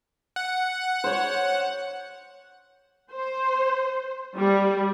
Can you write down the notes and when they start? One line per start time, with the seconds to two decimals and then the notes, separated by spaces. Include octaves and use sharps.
0.36 F#5
1.04 C5 C#5
3.13 C5
4.36 G3